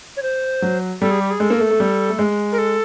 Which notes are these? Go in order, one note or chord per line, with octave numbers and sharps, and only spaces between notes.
C#5
C5
F#3
G3 A4
G#4
G4
G#4
G#3 A4
A#3
A3
A3
G3
A3
G#3
A#4
A4